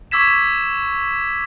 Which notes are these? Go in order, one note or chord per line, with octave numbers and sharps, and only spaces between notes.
C#6 D6 E6 G#6 B6 E7